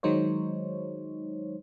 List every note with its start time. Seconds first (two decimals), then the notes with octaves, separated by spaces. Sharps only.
0.03 D#3 F#3 G#3 D#4 C5 C#5